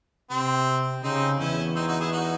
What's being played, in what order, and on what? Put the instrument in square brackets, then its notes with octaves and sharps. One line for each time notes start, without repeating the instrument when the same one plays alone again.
[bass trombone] C3 [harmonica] C4
[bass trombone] C#3 [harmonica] C4 D#4
[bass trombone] E2 [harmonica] C#4 E4
[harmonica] C4 D#4
D#4 F#4
E4 G#4
D#4 F#4